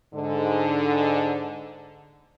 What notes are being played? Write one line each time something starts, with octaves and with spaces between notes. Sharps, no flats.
G#2 D3